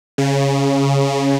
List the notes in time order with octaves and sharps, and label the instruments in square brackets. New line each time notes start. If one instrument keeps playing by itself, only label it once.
[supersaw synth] C#3